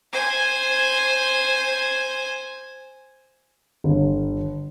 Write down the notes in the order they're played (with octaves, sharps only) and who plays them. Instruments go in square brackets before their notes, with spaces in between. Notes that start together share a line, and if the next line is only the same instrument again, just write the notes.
[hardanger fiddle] C5 G#5
[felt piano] G1